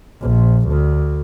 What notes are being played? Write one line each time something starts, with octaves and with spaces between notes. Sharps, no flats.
A#1
D2